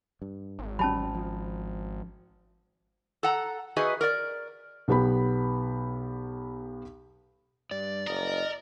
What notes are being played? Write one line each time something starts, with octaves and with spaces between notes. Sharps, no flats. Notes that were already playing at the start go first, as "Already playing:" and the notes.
G2
G#1
D1 F#3 G3 C#4 A5 B5
F3
A4 F#5 A#5
D#4 F#4 G#4 B4 D#5 E5
A#4 D5
B1 B3 G4 B5
G2 D5
F#1 A#4 D#5